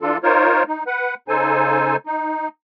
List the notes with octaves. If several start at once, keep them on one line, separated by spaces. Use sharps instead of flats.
E3 D4 F4 A4
D#4 F4 A#4 C5 C#5
D#4
B4 F#5
C#3 D#4 A4 C5 G#5
D#4